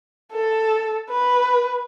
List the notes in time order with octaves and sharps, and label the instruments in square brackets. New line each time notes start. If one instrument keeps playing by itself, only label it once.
[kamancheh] A4
B4